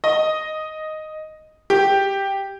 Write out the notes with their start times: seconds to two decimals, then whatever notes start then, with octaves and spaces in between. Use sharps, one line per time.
0.04 D#5
1.70 G4